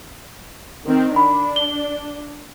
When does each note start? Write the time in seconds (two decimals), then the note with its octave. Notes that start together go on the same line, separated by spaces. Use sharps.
0.87 D#3 C4
1.16 D4 B5
1.56 G7